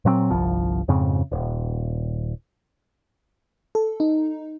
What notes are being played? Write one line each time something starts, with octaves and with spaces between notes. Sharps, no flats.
A#2 F#3 A#3 C4
G1 C2 F3
F2 G#2 C#3 C4
D#1
A4
D#4